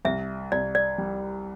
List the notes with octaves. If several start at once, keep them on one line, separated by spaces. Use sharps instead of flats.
C2 E5
C2 D5
D5
G3